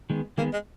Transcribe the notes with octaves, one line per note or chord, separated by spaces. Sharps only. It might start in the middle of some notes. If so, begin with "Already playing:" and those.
D#3 G#3 B3
D#3 G#3 A#3 B3
G#3